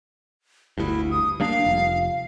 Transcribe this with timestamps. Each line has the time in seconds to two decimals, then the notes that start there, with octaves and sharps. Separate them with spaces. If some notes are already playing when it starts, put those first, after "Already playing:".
0.78 G1 D2 G2 E4
1.11 D#6
1.40 G3 A#3 D4 F5
1.64 F1